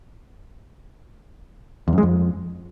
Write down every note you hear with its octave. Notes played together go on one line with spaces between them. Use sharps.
E2
F#2
G#3
F2